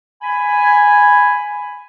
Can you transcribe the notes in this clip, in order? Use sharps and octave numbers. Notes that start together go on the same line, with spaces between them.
G#5 B5